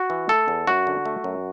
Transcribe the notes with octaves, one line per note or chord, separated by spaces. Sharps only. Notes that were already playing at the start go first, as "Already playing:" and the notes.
Already playing: F#4
E3
A3 A4
E2
F#2 F#4
D3
A3
F#2